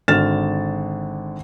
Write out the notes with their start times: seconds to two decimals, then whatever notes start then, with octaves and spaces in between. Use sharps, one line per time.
0.08 G#1 D3 F6 A6 E7